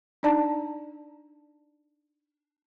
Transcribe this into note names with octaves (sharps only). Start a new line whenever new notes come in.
D4 D#4 D5 A5 A#5